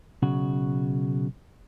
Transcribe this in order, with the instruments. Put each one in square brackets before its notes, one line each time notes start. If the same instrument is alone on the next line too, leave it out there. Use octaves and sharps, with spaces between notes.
[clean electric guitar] B1 C#3 F#4